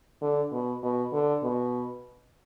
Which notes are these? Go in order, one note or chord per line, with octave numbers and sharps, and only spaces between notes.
D3
B2
B2
D3
B2